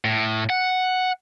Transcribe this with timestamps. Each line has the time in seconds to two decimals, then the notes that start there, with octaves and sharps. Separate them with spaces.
0.05 A2
0.50 F#5